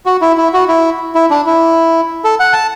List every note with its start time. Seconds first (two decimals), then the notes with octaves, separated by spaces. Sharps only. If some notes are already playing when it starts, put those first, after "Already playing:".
0.06 F#4
0.22 E4
0.38 E4
0.54 F#4
0.68 E4
1.15 E4
1.31 D4
1.46 E4
2.24 A4
2.40 F#5
2.53 A5